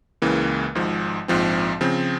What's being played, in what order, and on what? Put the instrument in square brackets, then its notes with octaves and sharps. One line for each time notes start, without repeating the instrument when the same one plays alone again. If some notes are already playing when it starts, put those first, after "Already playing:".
[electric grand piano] C#2 C#3 E3 A#3
G#1 G#2 F3
A#1 G#2 F3 C4
C#3 F3 C4